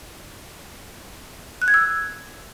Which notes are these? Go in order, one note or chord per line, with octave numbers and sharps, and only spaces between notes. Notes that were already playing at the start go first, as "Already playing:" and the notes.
F#6
G#6
E6